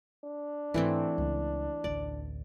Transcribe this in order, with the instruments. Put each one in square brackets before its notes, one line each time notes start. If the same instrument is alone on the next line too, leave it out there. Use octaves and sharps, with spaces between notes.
[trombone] D4
[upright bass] G#2 E4 [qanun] E3 A3 C4
[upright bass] C#2 C#3
[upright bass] A1 D2 [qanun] D5